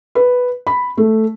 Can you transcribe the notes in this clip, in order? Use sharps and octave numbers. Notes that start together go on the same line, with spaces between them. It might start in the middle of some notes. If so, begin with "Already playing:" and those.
B4
B5
A3